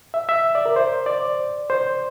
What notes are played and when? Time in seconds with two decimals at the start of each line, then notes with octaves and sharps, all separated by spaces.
0.14 E5
0.29 E5
0.55 D5
0.66 A#4
0.76 C5
1.06 D5
1.70 C5